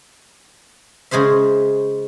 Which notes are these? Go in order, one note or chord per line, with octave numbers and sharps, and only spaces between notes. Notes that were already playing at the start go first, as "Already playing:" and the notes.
C#3 G#3 G#4 C5 E5